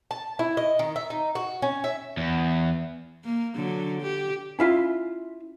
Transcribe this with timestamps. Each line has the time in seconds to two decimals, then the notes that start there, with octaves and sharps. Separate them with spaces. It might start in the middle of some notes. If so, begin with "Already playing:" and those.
0.11 A5
0.39 E4
0.57 D#5
0.79 D#3
0.96 E5
1.10 D#4
1.35 F#4
1.62 C#4
1.84 E5
2.17 E2
3.25 A#3
3.55 D3 F#3
4.02 G4
4.59 C#4 E4 F4 E5